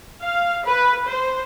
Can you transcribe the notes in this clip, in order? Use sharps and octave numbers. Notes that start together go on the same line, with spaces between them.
F5
B4
C5